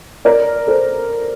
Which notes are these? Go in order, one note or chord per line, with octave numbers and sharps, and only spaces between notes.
A#4 D5
A4 C5